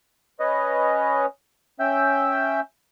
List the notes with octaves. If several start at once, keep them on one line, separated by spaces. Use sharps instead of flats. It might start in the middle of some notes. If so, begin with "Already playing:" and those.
C#4 B4 C#5 D#5
C#4 E5 G5 E6 G6